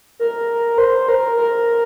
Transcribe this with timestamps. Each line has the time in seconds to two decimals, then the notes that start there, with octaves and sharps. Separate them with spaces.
0.20 A#4
0.78 C5
1.08 A#4
1.37 A#4